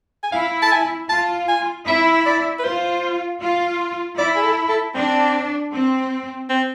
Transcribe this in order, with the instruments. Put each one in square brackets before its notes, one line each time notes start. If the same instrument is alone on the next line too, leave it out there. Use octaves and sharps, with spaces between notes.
[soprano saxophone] G#5
[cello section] E4 [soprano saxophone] F5
[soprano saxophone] A5
G#5
[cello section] F4 [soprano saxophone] A5
[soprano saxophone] G#5
[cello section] E4 [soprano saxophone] E5
[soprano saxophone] D5
B4
[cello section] F4 [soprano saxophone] C5
[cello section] F4
[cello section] E4 [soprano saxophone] D5
[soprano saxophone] G#4
A4
A4
[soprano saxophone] C4 [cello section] D4
[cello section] C4
[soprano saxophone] C4